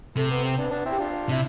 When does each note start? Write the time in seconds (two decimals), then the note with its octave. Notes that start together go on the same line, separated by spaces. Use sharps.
0.17 C3 A3
0.30 B3
0.44 C4
0.58 B3 D4
0.71 B3 D4
0.85 C4 E4
0.92 G4
0.99 D4 F4
1.29 C3 E4